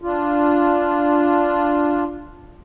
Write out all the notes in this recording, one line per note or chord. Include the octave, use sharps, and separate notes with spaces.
D4 F4